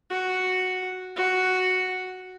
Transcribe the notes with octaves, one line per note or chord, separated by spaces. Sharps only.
F#4
F#4